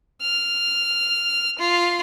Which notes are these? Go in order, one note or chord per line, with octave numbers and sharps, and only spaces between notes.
F6
F4